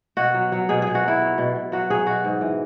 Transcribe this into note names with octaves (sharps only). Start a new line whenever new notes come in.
B2 F#4
F#3
F#3
B2 G#4
B2 G#4
F#4
F#3 E4
F#3
B2
B2
F#3 F#4
F#3 G#4
B2 F#4
G#2
E3